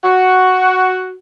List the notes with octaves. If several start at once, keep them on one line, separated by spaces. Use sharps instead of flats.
F#4